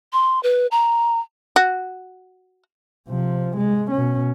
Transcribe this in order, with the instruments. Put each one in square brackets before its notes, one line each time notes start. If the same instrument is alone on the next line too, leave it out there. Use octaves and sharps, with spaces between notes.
[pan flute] C6
B4
A#5
[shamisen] F#4
[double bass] C3 F3
G#3
B2 C#4